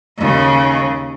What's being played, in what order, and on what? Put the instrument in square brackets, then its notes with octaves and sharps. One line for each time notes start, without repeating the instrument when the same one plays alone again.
[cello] D#2 C#3